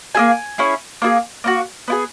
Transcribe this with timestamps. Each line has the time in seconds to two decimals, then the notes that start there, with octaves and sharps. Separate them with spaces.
0.15 A#3 E4 G#4 G#5
0.58 C#4 E4 G#4
1.02 A#3 E4 G#4
1.44 A#3 D#4 F#4
1.88 B3 E4 G#4